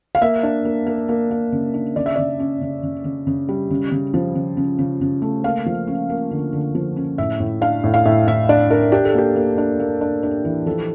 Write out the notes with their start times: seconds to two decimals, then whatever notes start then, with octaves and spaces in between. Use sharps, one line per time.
0.15 F5
0.21 A#3 E5
0.43 D4
0.65 A#3
0.87 A#3
1.09 A#3
1.31 A#3
1.52 C#3
1.74 D4
1.96 C#3 D5
2.06 E5
2.16 C#3 D5
2.40 C#4
2.61 C#3
2.83 C#3
3.05 C#3
3.27 C#3
3.49 G3
3.70 C#3
3.92 C#3
4.14 F3
4.35 C#3
4.57 C#3
4.79 C#3
5.01 C#3
5.22 A3
5.44 A#3 F5
5.66 F3
5.87 C#4
6.10 A#3
6.31 D3
6.53 D3
6.75 F3
6.96 C#4
7.18 A2 E5
7.40 A2
7.61 D4 F5
7.84 A2
7.94 F5
8.05 A2 E5
8.27 A2 E5
8.49 D4 D5
8.71 D4 A#4
8.92 D4 G4
9.05 A4
9.14 A#3 G4
9.36 A#3
9.58 D4
9.80 A#3
10.01 D4
10.23 D4
10.45 E3
10.66 F3 A4